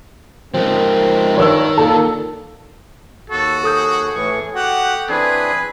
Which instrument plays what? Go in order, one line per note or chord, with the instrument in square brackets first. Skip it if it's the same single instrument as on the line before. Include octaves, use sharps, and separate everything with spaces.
[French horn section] C3 D#4 A#4 [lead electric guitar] F3 G#3 [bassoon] C4
[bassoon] G2 [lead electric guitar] D#3 [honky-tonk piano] C#5 E6
[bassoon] A#2 [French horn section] A#3 [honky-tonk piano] A4
[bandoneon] D#2 [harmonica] F#4 [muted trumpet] A4
[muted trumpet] G#4 [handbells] A4 D#6 G6
[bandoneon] A2 E3 C#6
[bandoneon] F#4 [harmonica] G4 F#5
[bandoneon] E3 C4 D4 [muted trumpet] G#4 [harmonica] B4